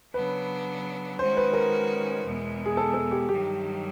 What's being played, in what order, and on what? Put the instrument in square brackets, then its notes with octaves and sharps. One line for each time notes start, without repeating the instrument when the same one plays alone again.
[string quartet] C#3 F#3 B3 D4 [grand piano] B4
[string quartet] D#3 G#3 C#4 F#4 [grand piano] C5
[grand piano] B4
A#4
[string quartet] E2 B2 G#3
[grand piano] G#4
A4
A4
G4
[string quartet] G2 D#3 F#3 [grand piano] G4